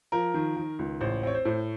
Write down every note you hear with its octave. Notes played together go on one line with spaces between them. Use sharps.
F3 A#4
D#3
D#3
C#2
A1 C5
C4 C#5
C5
A2